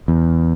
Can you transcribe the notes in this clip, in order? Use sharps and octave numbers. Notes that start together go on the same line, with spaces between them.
E2